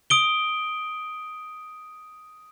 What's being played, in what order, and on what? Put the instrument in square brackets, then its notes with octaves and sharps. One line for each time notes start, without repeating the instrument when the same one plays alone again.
[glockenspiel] D#6 D7 G7